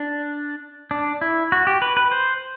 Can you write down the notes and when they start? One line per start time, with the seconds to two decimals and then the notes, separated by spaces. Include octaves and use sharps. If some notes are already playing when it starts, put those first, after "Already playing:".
Already playing: D4
0.91 D4
1.21 E4
1.52 F#4
1.67 G4
1.82 B4
1.97 B4
2.12 C5